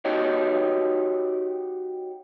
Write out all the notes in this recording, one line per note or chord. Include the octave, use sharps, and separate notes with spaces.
D#4 F#4 G4 C#5 D#5